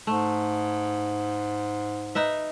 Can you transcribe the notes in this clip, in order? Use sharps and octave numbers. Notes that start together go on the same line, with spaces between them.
G#2 A3
D#4 B4 E5